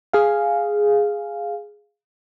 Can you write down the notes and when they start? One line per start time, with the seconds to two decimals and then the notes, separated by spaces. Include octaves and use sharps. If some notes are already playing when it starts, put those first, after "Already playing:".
0.13 G#4 F5